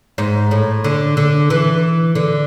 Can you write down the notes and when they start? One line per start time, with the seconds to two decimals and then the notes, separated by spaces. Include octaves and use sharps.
0.18 G#2
0.51 A2
0.84 D3
1.17 D3
1.50 E3
2.15 D3